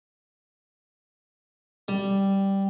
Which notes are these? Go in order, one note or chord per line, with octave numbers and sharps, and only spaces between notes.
G3